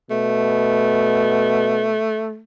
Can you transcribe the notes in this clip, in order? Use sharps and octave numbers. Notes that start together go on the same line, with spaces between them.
B2 A3